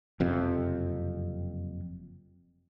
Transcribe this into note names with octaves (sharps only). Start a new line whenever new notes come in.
F#1 F2 C3